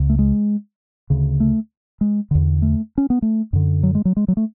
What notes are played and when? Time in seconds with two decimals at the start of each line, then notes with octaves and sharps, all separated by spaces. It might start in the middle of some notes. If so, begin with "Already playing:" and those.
Already playing: C#2 C#3
0.09 A3
0.19 G#3
1.10 D2 C#3
1.40 A3
2.01 G#3
2.31 E2 D3
2.62 A3
2.98 C#4
3.10 B3
3.22 A3
3.53 F#2 D3
3.83 F#3
3.95 G#3
4.05 F#3
4.17 G#3
4.28 F#3
4.37 A3